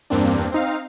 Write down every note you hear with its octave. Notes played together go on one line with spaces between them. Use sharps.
E2 G2 A#3 C4 D4
C4 D#4 F5